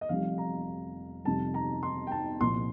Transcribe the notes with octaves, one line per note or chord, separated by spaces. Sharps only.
D#5
F1 F2 D#3 G3 F5
A#5
F2 C3 D#3 G3 A5
A#5
C6
G5
A5
C2 A#2 F3 C6